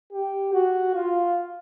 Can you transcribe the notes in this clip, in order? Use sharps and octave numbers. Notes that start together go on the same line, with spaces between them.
G4
F#4
F4